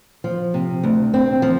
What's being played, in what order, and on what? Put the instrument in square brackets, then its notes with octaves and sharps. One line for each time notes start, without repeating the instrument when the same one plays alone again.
[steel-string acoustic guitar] F3
C3
D2
C4
F3